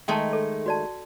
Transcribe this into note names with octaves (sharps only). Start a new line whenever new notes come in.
D#3 G#3 A3 G5 A5
A4
F#4 D5 A5